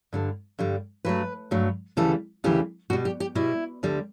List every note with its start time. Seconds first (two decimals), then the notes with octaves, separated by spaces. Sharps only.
0.13 G2 D3 G3
0.59 G2 D3 G3
1.05 G2 F#3 A3 B4
1.51 G2 F#3 A3
1.97 D2 C#3 E3 G3 A4
2.44 D2 C#3 E3 G3 G4
2.90 B2 G3 F#4
3.05 G4
3.20 G4
3.35 B2 G3 E4
3.83 D2 D3 G3